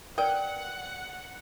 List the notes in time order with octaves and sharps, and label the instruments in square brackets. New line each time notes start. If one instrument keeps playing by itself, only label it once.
[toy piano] A#4 B4 D5 [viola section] F#5 [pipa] G5